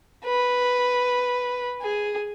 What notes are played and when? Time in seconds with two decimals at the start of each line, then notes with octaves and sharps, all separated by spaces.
0.25 B4
1.81 G#4